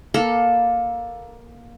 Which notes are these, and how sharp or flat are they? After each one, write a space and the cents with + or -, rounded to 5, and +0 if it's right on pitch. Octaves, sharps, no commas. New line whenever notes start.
A#3 +15 A4 +0